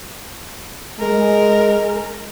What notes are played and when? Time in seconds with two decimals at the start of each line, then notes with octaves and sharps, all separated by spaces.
1.00 G#3 A#4